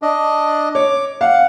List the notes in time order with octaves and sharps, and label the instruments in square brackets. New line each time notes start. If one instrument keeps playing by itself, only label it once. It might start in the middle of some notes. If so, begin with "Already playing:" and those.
[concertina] D4 D#5
[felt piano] C#5 [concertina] D6
[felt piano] F5 [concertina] F#5